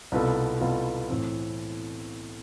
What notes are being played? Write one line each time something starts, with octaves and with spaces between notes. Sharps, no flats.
C2 B2 B3 F4 A4
C2 B2 B3 F4 A4
A2 E3 A3 C4